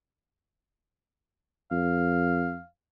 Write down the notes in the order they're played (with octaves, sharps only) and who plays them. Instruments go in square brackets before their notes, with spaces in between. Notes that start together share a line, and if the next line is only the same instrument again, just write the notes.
[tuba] F2 [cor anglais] F5